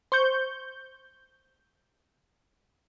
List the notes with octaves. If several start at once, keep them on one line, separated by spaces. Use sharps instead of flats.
C5 C#6 G6